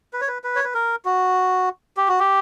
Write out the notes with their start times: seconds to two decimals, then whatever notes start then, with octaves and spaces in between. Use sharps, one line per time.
0.13 B4
0.21 C#5
0.28 B4
0.44 B4
0.55 C#5
0.64 B4
0.74 A#4
1.05 F#4
1.97 G4
2.08 F#4
2.19 G4